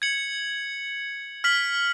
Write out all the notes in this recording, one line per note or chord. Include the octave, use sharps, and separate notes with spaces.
G#6 C#7 F#7
F6 B6 F#7